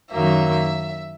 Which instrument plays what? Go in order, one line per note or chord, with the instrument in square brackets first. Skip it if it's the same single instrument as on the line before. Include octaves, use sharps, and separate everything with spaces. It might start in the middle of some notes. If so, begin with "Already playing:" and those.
[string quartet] F#2 D#3 F#3 A#3 E5